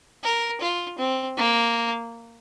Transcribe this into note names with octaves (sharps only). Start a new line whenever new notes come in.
A#4
F4
C4
A#3